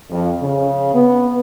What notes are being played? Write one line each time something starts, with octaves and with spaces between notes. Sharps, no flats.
F2
C#3
B3